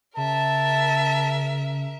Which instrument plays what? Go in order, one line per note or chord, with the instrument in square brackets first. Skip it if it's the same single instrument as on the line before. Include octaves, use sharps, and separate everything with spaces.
[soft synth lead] C#3 [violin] A#4 E5 [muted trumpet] A5